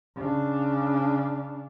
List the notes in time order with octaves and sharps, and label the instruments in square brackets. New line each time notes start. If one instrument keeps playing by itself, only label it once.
[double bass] C#3 D4